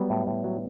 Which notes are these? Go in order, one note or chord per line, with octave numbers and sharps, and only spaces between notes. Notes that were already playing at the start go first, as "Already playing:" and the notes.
Already playing: F#3 G3 B3
A2
A2
F#3